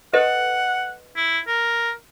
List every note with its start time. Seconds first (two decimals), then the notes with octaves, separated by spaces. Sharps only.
0.13 A4 B4 D#5 F#5
1.16 E4
1.47 A#4